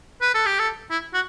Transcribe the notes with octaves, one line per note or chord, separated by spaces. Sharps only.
B4
A4
G4
A4
E4
F#4